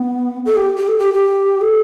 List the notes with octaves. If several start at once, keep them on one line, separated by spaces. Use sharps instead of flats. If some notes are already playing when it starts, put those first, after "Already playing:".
Already playing: B3
A4
G4
G4
A4
G4
G4
A4